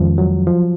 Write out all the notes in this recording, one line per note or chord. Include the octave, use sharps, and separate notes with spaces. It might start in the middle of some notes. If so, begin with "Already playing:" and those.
Already playing: F2 D#3 F3 G#3 C#4
F#3
F3